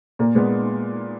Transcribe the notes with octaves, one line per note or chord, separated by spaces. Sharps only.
A#2 A#3
A#2 G#3 B3